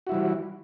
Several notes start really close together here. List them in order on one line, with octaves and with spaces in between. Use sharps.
F#4 E4 G3 E3